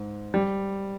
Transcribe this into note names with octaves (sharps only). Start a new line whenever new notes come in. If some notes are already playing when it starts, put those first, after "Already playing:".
Already playing: G#2
G3